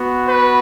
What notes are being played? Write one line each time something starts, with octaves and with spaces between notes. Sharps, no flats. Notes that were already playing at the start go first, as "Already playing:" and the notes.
Already playing: B3 F#4
B4